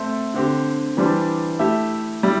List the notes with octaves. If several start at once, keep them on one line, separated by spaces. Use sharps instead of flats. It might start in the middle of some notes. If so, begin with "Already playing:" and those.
Already playing: A3 C4 A4 C5 E5
D3 C4 G4
E3 G3 D4 C5
A3 E4 G4 E5
G3 E4